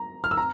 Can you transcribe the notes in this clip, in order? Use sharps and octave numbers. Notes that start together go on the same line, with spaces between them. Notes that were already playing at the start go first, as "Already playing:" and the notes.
Already playing: A#5
F6
E6
A#5